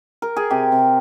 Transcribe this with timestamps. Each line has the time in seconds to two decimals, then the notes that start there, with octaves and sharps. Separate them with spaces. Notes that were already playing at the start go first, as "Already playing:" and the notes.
0.22 A#4
0.36 G#4
0.50 C3 G4
0.72 C3